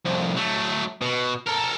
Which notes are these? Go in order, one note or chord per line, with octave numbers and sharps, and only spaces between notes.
C2 F2
F#3 A3
B2
A4 A#4